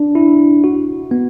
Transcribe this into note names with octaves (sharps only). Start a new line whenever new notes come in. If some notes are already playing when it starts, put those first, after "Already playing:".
Already playing: D4
E4
F#4
B3